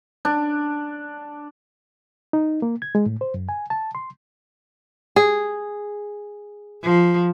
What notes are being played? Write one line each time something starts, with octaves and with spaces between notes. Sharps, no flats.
D4
D#4
A#3
G#6
G#3
A2
C5
F#2
G#5
A5
C6
G#4
F3